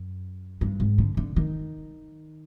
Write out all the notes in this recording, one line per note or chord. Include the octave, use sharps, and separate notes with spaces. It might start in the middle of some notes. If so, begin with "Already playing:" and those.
Already playing: F#2
G2
G#2
D3
D3
D#3